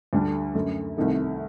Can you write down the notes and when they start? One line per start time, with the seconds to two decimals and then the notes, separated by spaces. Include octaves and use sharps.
0.13 D2 D3 G3 D4
0.55 F#2 D3 A3
0.97 C2 C3 D#3 A3